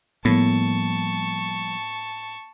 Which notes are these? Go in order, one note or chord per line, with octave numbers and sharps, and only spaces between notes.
A2 F3 G3 A#3 B3 A5 C#6